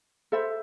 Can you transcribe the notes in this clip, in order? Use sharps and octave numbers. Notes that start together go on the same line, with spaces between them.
A4 C5 E5 B5